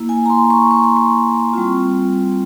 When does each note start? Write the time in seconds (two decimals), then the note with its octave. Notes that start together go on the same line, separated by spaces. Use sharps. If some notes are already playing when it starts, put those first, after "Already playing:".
Already playing: A#3 E4
0.09 G#5
0.26 A#5
0.30 C6
0.50 C#6
0.71 C#6
0.84 C6
0.97 C#6
1.53 G3 C4 F4